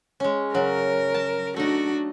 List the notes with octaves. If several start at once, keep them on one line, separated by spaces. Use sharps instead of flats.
G#3 C#4
C#3 F#3 A#4
A5
A3 D4 D#4 F#4